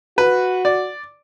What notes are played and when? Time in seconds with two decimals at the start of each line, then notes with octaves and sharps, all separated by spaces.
0.18 F#4 B4
0.65 D5